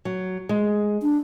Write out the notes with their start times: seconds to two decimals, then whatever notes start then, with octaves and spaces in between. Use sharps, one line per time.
0.05 F#3
0.49 G#3
1.02 D4